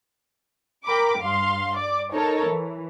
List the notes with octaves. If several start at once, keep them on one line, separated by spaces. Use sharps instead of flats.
A#4 G5 B5 D6
G2 F5 C6
D5 D6
D#4 A4 A#4 C#5
E3